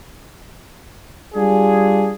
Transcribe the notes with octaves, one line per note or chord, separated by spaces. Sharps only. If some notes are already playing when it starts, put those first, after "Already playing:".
G3 D4 F4 G#4